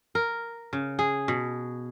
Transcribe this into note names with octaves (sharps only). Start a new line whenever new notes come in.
A#4
C#3
G#4
B2